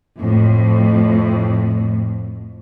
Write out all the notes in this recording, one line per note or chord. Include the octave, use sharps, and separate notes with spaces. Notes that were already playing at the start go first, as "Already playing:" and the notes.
F2 A2